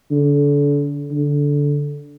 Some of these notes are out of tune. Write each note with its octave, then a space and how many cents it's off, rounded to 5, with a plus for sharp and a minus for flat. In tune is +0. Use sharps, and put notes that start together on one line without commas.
D3 -30
D3 -15